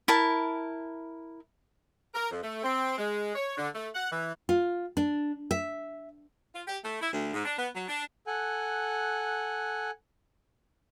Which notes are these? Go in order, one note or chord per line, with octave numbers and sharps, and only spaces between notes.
E4 A#4 A5
A#4
F2
A3
C4
G#3
C#5
D3
A3
F#5
E3
F4
D4
E5
F4
G4
A3
E4
D2
G#2
D4
B3
F#3
D4
A4 F#5 G#5 F#6